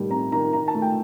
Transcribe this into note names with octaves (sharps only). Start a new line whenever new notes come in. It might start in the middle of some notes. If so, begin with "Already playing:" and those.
Already playing: A2 D#3 G3
C4 A#5
D#3 A#5
D#3 A#5
A5
A3
G5